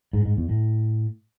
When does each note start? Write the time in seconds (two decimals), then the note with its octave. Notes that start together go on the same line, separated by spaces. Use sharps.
0.13 G#2
0.25 G#2
0.37 E2
0.49 A2